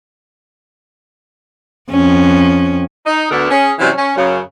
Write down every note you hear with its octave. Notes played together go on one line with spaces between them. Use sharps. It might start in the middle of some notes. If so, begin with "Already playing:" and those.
F2 C#4
D#4
D2 D3 B3 A4 A#4 D5
C#4 G#4
C3 E3 F#3 G3 C#4
C#4
F#2 C#3